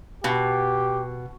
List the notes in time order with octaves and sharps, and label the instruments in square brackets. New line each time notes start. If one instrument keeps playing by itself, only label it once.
[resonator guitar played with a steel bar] B2 [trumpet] G4